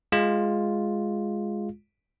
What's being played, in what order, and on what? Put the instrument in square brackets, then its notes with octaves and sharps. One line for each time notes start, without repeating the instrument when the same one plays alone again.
[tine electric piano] G#3 F4